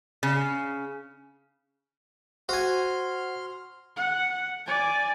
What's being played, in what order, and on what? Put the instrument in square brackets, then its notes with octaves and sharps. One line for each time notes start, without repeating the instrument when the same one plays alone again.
[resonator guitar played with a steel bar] C#3
[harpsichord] F#4 G#5 [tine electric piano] C5 F#5 [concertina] C6 F6
[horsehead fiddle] F#5
D5 G#5